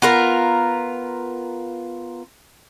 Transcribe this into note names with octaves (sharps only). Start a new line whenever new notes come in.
B3 F4 A#4